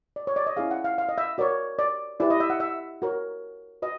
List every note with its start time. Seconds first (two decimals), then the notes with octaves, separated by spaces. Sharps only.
0.16 D5
0.27 C#5
0.36 D5
0.47 D#5
0.57 C#4 E4 G#4 F5
0.71 F#5
0.84 F5
0.98 F5
1.09 D#5
1.18 E5
1.38 F#4 A#4 C#5 D5
1.79 D5
2.20 E4 G4 B4 D5
2.30 D#5
2.40 E5
2.50 F#5
2.60 E5
3.02 F#4 A#4 C#5
3.82 F#4 B4 D#5